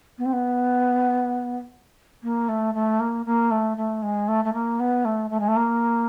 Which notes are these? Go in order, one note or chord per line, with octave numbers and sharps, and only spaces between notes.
B3
C4
B3
A#3
A3
A3
A#3
A#3
A3
A3
G#3
A3
A3
A#3
B3
A3
A3
G#3
A3
A#3